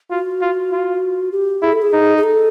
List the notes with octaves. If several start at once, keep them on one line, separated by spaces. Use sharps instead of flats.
F4 F#4
F4
F4
G4
E4 G#4
A4
G#4
D#4
G#4
A4